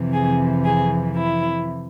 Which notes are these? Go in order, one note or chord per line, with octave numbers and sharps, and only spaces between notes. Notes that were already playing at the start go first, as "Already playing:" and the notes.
Already playing: F2 C3 E3
G#4
G#4
E4